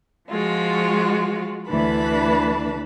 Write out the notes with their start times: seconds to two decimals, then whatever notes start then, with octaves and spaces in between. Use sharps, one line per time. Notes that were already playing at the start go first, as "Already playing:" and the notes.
0.29 F3 G#3 F4 F#4
1.68 D2 E3 D4 B4 A5 B5